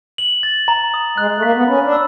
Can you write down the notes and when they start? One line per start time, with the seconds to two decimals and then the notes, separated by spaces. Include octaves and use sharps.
0.18 F#7
0.43 A6
0.68 A#5
0.94 D#6
1.18 G#3 F#6
1.38 A3
1.43 A#3 B6
1.55 B3
1.68 C#4 B5
1.84 D4
1.92 E6